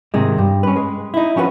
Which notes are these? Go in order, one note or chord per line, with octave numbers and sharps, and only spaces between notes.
G#2 C3 D#3 G#3
G2
C#4 B4
G#3
D#4 E4
F3 C#4 F#4 G4 B4